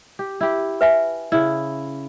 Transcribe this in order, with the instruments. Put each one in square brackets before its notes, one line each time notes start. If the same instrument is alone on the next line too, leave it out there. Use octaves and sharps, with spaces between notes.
[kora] G4
E4 G4
[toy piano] B4 E5 G#5
[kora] C#3 E4